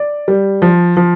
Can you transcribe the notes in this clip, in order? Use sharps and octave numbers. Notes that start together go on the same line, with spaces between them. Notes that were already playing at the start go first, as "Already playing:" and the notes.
Already playing: D5
G3
F3
F3